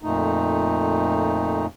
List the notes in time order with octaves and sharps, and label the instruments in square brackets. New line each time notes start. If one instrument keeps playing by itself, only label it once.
[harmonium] F2 A#2 A3 D#4